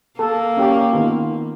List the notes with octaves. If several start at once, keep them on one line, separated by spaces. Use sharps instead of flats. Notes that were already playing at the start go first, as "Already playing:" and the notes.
A#3 A4
C#4 G4
D#3 B3 F4